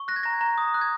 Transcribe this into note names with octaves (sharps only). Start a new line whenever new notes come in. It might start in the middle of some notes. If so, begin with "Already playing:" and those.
Already playing: C#6
F#6 A#6
G#6
A#5 A#6
A#5
D#6
F#6
G#6